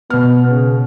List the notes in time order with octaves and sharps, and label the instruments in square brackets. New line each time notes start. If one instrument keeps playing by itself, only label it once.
[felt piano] B2 F6 [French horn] B3
[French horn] C#3